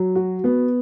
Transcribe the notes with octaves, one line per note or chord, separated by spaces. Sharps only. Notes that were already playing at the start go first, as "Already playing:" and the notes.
Already playing: F#3
F#4
B3